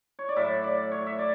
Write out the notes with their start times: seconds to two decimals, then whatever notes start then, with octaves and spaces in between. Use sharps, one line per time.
0.19 C#5
0.29 D5
0.36 A2 F#3 E5
0.64 D5
0.91 C#5
1.07 E5
1.19 D5